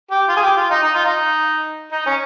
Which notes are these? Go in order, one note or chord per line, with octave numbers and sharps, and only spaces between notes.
G4
F4
G#4
G4
F4
D#4
D#4
F4
D#4
D#4
C#4